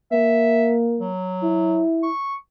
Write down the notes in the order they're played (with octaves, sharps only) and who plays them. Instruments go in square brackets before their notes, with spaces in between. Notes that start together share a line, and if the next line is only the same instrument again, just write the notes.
[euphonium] A#3 [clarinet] E5
[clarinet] F#3
[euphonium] E4
[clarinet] C#6